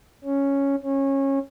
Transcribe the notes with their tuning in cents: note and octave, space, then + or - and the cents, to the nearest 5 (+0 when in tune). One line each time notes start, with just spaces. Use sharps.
C#4 +0
C#4 -20